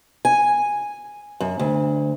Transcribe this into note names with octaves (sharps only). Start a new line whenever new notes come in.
G#5
F#2
D2